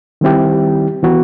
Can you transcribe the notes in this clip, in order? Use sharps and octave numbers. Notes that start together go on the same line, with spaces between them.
D#3 G3 C4 E4 G4
E3 B3 F#4